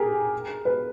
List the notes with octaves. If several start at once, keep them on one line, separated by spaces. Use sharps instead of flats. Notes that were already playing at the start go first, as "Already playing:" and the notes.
Already playing: G4 G#4 A#4
B4